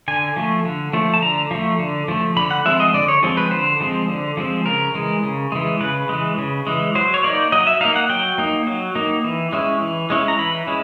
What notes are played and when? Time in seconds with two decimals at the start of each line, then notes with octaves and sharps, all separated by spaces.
0.08 D3 G#5
0.36 F3 A3
0.65 D3
0.93 F3 A3
1.14 A5
1.22 D3 A#5
1.51 F3 A3
1.79 D3
2.08 F3 A3
2.37 D3 B5
2.51 F#5
2.65 F3 G#3 C4 E5
2.80 D#5
2.94 D3 D5
3.08 C#5
3.23 F3 G#3 C4
3.37 B4
3.51 D3 C5
3.81 F3 G#3 C4
4.08 D3
4.37 F3 G#3 C4
4.66 C#3 A#4
4.95 E3 G#3
5.23 C#3
5.52 E3 G#3
5.81 C#3 B4
6.09 E3 G#3
6.38 C#3
6.67 E3 G#3
6.95 F#3 C5
7.14 C#5
7.24 A#3 D#4 D5
7.52 F#3 D#5
7.67 E5
7.81 A#3 D#4 F5
7.96 F#5
8.10 F#3 G5
8.38 A#3 D#4
8.67 F#3
8.95 A#3 D#4
9.24 E3
9.53 G#3 C#4 E4
9.82 E3
10.10 G#3 C#4 E4
10.28 A#5
10.39 E3 B5
10.67 G#3 C#4 E4